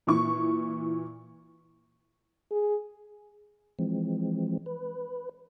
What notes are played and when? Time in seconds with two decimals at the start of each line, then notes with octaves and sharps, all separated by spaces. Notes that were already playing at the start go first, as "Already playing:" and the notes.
0.07 A#2 E3 C#6
2.51 G#4
3.79 E3 F3 G#3 C4
4.66 B4